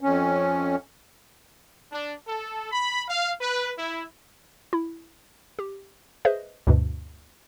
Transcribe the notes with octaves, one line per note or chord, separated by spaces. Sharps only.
F2 C#4
D4
A4
B5
F5
B4
E4
E4
G4
G#4 B4 C5 D#5 E5
D2 G2 B2